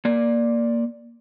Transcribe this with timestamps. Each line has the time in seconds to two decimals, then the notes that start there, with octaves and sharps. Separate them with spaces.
0.05 A#3 D5